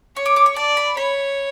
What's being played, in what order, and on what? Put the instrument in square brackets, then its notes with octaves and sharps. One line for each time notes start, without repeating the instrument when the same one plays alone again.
[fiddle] C#5 [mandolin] C#6
[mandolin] D6
D6
C#6
[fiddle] D5 [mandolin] A5
[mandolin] B5
[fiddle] C#5 [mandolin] B5